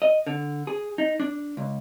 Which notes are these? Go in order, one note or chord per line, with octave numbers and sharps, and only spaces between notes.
D#5
D3
G#4
D#4
D4
C#2